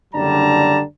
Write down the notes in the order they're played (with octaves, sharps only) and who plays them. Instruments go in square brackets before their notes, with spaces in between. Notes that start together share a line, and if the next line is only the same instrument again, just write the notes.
[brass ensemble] F#1 D3 G3 D4 A5 A#5